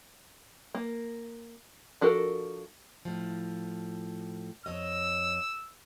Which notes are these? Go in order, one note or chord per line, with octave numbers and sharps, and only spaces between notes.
A#3
F3 D4 F#4 A4 A#4
A2 F3
F2 C#5 D#5 E6